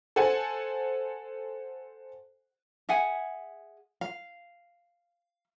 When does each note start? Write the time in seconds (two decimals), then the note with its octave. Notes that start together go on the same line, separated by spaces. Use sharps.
0.16 A4 C5 F#5 G#5
2.89 G#4 E5 F#5 G#5
4.01 F5